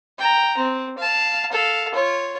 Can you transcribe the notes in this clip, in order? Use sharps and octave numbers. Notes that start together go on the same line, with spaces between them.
G5 A#5
C4
F5 A5
A4 F5
F4 C#5